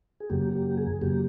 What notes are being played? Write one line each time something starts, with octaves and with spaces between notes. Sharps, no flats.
G#4
F#2 C#3 F#3 A#3 G4
G4
G#4
F#2 C#3 F#3 A#3 G4